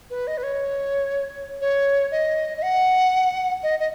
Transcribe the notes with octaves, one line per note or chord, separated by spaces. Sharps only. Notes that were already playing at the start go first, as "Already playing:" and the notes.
B4
D#5
B4
C#5
C#5
D#5
D#5
F#5
D#5
D#5